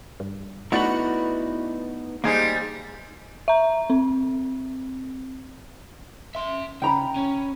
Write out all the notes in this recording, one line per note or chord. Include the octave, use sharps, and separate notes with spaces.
G2
A3 B3 D#4 E4 F#4 B4 D5 B5
G3 G#3 A#3 D#4 G#4 C5
E5 A#5
C4
E5 C6
C#3 G5 A#5 B5
C#4